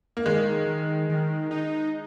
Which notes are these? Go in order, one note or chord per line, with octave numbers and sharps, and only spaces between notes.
A#3
D#3 G#3
D#3
D#3
D#4